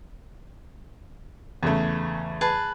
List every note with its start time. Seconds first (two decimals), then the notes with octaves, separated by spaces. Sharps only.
1.63 E2 C#3 A3
2.41 G#4 B4 A5